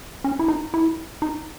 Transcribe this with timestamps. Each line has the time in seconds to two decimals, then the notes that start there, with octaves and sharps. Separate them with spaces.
0.24 C#4
0.39 E4
0.48 D#4
0.74 E4
1.22 D#4